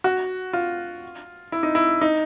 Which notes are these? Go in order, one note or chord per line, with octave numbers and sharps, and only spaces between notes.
F#4
F4
E4
D#4
E4
D#4